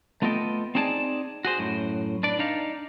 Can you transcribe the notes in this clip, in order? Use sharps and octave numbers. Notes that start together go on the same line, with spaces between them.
A3 B3 F4 A4 D#5 G5
C4 D#4 E4 G#4 D5 A5
F#4 G#4 C5
F#2 A2
D4 B4 D5
D4 D#4 F5